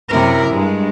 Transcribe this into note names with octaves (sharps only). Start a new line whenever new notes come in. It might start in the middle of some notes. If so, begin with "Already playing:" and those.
F#2 C3 E4 A#4
G2 G#3